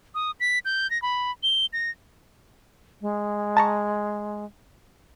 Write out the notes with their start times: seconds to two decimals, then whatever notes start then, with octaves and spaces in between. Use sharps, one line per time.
0.15 D#6
0.40 B6
0.65 G6
0.91 A#6
1.02 B5
1.43 G7
1.73 A#6
3.01 G#3
3.57 A5 A#5 C#6